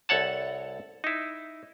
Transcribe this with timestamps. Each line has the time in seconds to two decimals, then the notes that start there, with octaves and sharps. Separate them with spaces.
0.09 C2 A4 C#5 F#5 A5
1.04 D#4 E4